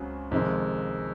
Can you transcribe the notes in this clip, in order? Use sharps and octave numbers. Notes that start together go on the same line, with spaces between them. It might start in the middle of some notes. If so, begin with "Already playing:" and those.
Already playing: C#2 C#3 F#3 C4
F2 C3 D#3 G#3